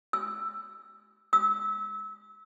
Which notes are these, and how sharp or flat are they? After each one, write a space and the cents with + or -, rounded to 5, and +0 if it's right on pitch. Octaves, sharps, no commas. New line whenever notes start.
E6 +10
E6 -25